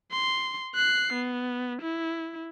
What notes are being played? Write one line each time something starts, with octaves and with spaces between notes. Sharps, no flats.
C6
F#6 C7
B3
E4